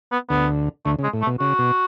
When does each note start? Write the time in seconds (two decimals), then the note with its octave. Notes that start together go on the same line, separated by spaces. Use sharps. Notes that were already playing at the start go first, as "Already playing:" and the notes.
0.12 B3
0.30 D2 D3 B3
0.86 D2 D3 A3
0.99 C#3
1.04 G#3
1.13 A2
1.22 A3
1.27 B2
1.40 C#3 F#4
1.59 B2